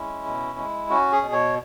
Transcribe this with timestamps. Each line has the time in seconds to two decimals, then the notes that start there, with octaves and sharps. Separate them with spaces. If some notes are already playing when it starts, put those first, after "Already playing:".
Already playing: G#3 C#4 E4
0.26 B2
0.58 G#3
0.90 C#4 F#4
1.12 G#4
1.22 B2
1.32 C#5